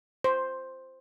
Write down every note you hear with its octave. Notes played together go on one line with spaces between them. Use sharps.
C5